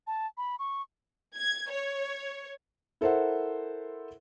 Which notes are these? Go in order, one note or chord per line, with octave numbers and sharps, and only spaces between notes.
A5
B5
C#6
G#6
C#5
E4 A4 A#4 C5 E5 F#5